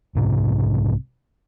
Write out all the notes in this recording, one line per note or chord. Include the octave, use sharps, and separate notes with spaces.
B1 G#2 C3